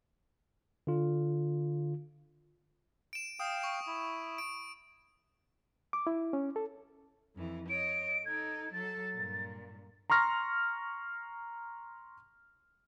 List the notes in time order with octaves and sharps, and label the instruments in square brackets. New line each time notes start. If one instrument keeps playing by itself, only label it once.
[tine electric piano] D3 F4
[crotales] D7 E7
[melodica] F5 G5 [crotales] D#6
[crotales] C#6
[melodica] E4
[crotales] D7
[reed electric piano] D6
E4
C#4
A4
[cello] F2 E3
[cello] C#5 D#5 [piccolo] D7
[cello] D#4 A4 [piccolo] G#6
[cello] F#3 A4 [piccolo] A6
[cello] G2 A#2
[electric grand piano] A#5 C6 C#6 F6 A#6